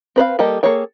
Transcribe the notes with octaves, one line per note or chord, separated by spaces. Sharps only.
C4 B4 C5 F5
G3 A#3 G4 A4 D#5
A#3 G#4 A4 C#5 G5